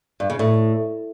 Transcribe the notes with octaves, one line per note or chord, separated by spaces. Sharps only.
G2
C#3
A2